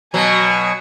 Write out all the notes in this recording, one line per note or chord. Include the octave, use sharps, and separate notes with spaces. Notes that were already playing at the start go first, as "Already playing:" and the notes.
B2 F#3 G#5 C#6